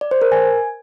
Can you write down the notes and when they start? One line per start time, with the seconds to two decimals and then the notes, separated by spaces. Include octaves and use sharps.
0.01 D5
0.11 C5
0.22 A#4
0.32 G#5